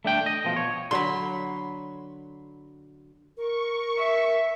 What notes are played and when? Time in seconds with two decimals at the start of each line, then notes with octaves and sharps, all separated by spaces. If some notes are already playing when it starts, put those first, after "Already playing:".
0.05 A3 D4 G5
0.26 D#5
0.45 B2 F3
0.56 C#5
0.91 D3 F#3 B5 C6
3.37 A#4 C#6
3.98 E5